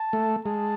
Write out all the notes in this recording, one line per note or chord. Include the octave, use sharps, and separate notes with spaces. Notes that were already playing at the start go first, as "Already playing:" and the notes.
Already playing: A5
A3
G#3 A5